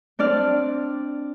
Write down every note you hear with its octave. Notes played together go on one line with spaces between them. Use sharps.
C4 D4 D5 F6